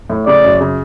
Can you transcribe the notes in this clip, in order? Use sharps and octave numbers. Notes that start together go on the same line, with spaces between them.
A2
C#3 D5
F#2
C#3